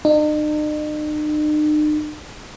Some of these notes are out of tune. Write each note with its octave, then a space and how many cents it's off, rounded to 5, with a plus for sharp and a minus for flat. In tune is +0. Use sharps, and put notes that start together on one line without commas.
D#4 -45